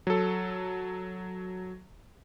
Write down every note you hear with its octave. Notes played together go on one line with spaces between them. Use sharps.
F#3 A4